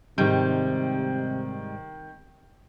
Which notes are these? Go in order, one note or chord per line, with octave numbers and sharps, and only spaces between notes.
G#2 C3 D#3 G3 G6